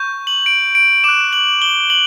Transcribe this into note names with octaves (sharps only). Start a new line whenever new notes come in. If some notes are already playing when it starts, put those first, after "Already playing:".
Already playing: C#6 G6
F#7
D7
D7
D6 F#6 E7
F#7
G7
F#7